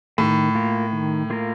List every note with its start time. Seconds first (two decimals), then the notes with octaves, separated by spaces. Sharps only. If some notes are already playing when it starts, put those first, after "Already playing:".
0.18 A2 D#3
0.55 A#3 F4 A#4
0.93 D#3
1.30 A#3 F4 A#4